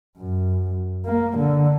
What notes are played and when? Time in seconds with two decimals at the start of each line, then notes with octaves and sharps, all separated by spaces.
0.17 F#2
1.05 A#3
1.37 D3